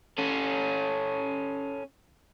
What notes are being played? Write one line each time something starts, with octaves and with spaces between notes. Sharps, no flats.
C#4 A4